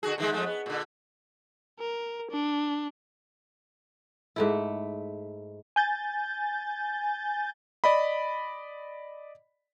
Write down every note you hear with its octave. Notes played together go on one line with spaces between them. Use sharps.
D3 F#4 G#4
D3 D#3 G#3
F2 G#3 A3
B3
A#2 D3
A#4
D4
G#2 A3 E4
G#5 G6 A6
D5 D#5 B5